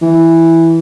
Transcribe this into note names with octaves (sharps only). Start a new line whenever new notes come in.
E3